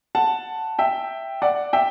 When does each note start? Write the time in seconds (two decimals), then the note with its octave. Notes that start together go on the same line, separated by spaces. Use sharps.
0.15 F#5 A5
0.79 E5 G5
1.42 D5 F#5
1.73 E5 G5